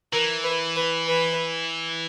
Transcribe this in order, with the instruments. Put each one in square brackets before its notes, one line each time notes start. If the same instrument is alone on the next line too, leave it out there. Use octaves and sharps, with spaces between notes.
[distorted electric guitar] E3 [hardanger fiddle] A#4
[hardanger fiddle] B4
B4
B4